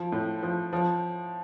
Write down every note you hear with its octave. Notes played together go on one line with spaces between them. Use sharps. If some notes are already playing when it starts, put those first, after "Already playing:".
Already playing: F3
A2
F3
F3